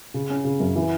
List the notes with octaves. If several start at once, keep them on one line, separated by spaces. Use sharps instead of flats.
C#3
C#4
C#3
F#2
E3